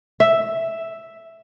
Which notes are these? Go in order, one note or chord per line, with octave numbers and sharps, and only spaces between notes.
E5